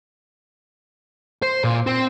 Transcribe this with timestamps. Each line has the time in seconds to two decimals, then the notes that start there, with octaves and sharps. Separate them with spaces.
1.42 C5
1.64 A#2
1.87 C4